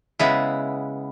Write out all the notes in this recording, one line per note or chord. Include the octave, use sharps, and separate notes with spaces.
C#3 G#3 B3 E4